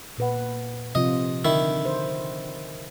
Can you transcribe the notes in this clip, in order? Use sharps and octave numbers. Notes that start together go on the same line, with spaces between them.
A#2 B4 F#5
C3 F3 F4 D#5
D3 D#3 E4
C5